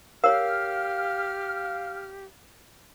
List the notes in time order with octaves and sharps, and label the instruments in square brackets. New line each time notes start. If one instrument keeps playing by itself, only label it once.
[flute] G4 [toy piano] A#4 C#5 [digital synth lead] F5 [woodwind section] F6